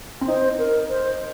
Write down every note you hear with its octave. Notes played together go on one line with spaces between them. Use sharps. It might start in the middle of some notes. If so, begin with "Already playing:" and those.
C4
D#4 C5
A#4
C5